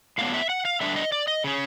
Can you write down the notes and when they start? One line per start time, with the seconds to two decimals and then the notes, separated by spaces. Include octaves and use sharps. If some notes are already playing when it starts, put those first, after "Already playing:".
0.18 A2 F#3 B3 D4 F5
0.34 E5
0.50 F#5
0.65 F5
0.80 D3 G3 B3 D4 E5
0.96 D#5
1.12 D5
1.28 D#5
1.44 C#3 C#4